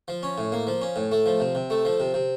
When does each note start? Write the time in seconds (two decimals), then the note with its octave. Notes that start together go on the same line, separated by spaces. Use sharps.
0.08 F3
0.23 C#4
0.38 A2
0.52 A#3
0.67 F3
0.81 C#4
0.96 A2
1.12 A3
1.26 F3
1.40 C3
1.55 C3
1.70 A3
1.85 F3
2.00 C3
2.14 C3